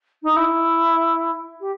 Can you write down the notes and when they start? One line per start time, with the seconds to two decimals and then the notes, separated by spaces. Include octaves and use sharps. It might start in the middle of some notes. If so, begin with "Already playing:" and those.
0.23 D#4
0.36 E4
1.60 G4